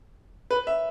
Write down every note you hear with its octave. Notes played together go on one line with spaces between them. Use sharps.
B4
E5